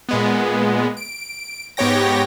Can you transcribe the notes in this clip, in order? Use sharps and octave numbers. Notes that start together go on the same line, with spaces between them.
A#2 G#3 B3
D7
G#2 B3 G4 C#5 G5 A#6